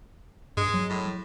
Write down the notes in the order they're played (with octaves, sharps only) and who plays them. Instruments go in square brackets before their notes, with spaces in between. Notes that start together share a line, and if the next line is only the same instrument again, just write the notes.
[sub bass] G2 [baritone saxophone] G#3
[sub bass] F#3
[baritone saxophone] A2